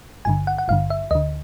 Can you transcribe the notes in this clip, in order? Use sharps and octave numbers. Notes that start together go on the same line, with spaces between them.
G#1 G2 D3 G#5
F#5
F#5
G#1 G2 D3 F5
E5
D2 D3 D#5